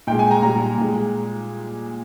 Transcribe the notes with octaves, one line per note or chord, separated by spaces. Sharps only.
A#2 G#3 G5
G#5
A#5
A#2 G3 A#5
A#2 G#3